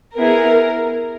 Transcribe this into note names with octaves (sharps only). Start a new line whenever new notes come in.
B3 E4 G#4 A#4